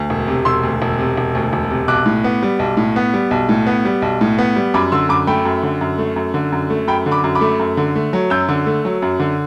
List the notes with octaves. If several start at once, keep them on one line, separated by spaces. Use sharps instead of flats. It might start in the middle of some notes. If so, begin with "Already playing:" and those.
Already playing: D2
E1
C3
E1 C6 E6
D2
E1
C3
E1
D2
E1
C3
B1 D6 F#6
A2
B3
G3
B1
A2
B3
G3
B1
A2
B3
G3
B1
A2
B3
G3
F#2 B5 D6
D3 C6 E6
F#2 B5 D6
A3 G5 B5
F#2
D3
F#2
A3
F#2
D3
F#2
A3
F#2 G5 B5
D3
B5 D6
F#2
B5 D6
A3
F#2
D3
A3
F#3
F#2 E6 G6
D3
A3
F#3
F#2
D3